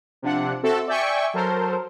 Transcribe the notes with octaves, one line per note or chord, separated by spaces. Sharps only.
C3 F3 D4 F#5
C4 F#4 A4 E5
D5 E5 G5 G#5 C#6
F#3 A4 A#4 C5